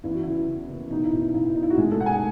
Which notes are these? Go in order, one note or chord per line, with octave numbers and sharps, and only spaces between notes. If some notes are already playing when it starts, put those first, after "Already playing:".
E2 E4
F#4
C#3 E4
C#3
F#1
B2 D#4
E4
B1
D#4
B1 E4
B2 D#4
E4
F#4
B1 G#3 G#4
A3 A4
B1 F#5
G#4 G#5